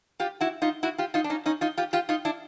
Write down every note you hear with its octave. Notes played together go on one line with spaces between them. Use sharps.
F4 G4
E4 F#4
D#4 F4
E4 F#4
F4 G4
D#4 F4
D4
C#4 D#4
C#4 D#4
D#4 F4
F4 G4
F4 G4
D#4 F4
D4 E4